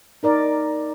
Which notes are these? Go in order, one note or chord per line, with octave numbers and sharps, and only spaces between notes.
D#4 A#4 D5